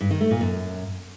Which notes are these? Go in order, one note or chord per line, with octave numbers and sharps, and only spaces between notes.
G2
D#3
A3
A#2
F#2